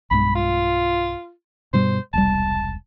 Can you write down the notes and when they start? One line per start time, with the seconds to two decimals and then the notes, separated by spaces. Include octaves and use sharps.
0.11 B1 G2 G#3 B5
0.35 F4
1.73 G2 B2 G3 C5
2.13 E1 C2 G3 A5